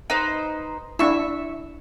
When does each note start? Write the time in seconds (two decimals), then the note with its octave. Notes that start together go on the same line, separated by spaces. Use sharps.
0.10 D#4 B4 C5
0.99 D4 E4 E5 C#6